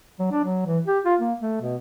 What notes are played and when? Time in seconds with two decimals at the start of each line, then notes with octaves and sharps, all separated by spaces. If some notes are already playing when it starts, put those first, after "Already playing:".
0.19 F#3
0.31 D4
0.44 F#3
0.66 E3
0.86 G4
1.05 F4
1.19 A#3
1.39 A3
1.61 B2